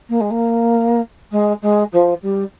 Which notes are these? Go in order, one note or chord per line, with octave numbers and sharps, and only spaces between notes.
A#3
G#3
A#3
G#3
G#3
F3
G3